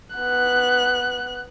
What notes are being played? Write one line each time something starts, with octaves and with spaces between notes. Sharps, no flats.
B3 F#6